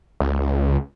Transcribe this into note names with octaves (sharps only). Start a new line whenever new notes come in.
C#2